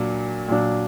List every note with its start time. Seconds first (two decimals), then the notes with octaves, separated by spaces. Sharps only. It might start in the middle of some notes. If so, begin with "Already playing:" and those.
Already playing: A#2 F#3 D4
0.48 A#2 F#3 D4